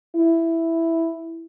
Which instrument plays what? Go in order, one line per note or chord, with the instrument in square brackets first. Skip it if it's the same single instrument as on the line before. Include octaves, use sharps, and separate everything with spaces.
[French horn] E4